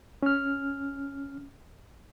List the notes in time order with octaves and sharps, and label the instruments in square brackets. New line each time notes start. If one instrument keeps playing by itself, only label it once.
[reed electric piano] C#4 F6